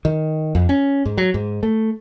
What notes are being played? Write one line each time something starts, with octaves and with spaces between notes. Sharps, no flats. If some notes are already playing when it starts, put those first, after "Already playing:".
D#3
F2
C#4
G#2
F#3
G#2
A3